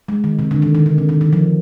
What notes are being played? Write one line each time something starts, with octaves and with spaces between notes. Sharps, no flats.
G#3
D#3
C3
D3
D#3
D#3
D3
C3
D#3
D#3
F3